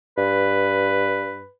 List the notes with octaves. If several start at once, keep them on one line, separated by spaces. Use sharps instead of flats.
G2 B4